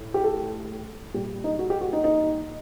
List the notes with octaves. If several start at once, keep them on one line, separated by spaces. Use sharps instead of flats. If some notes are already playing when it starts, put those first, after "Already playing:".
Already playing: A2
G4
A4
A#2 G3 G4
D#4
F#4
G4
F#4
D#4
D#4